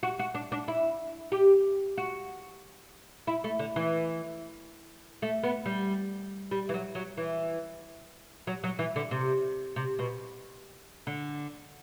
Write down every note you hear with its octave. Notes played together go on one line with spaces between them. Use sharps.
F#4
F#4
D4
D4
E4
G4
F#4
E4
A3
D3
E3
A3
B3
G3
G3
E3
F#3
F#3
E3
F#3
F#3
E3
D3
C3
C3
B2
D3